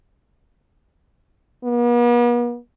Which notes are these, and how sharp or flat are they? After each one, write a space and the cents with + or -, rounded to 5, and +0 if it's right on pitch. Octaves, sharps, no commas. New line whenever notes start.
B3 -45